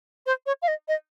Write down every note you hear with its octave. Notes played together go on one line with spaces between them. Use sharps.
C5
C#5
F5
D#5
D#5